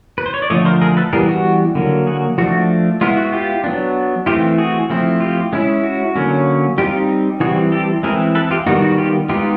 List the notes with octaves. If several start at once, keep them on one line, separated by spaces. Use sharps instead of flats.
B4
C5
C#5
D5
D3 F3 A3 C#5 D#5
A#4 C5
G#4 A#4
A4 B4
E3 G3 B3 G#4 A#4
F#4
D3 F#3 A#3
F#4 G#4
F3 A3 D4 F#4
G#3 B3 E4 F4
F#4
F4 G4
F#3 B3 D4
E3 A3 C4 E4 F4 G4
F#4 G#4
F3 A3 C4 E4
F4 G4
G#3 C#4 E4
F#4
D3 F#3 A#3 C#4
G3 C4 D#4 F4 G4
E3 G3 C4 F#4 G#4
G4 A4
E3 G#3 C4 E4 G#4 A#4
A4 B4
F4 G4
D#3 G3 B3 D#4 F#4
F#4
F4 G4
G#3 B3 D#4 F4 G4